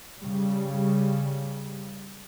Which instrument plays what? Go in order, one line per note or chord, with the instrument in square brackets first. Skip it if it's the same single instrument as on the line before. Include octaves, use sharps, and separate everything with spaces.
[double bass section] C#3 G3